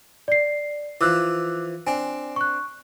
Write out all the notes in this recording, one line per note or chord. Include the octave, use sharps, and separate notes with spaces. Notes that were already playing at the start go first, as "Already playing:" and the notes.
D5 C7
E3 F3 D6 E6 F#6
C4 D4 G#5
C#6 F#6